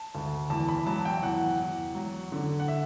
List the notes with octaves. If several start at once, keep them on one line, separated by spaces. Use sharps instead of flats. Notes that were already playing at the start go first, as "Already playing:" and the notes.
Already playing: A5
D2
E2 A5
B5
F#3 A5
G5
E2 F#5
E2
F#3
D3
F#5
E5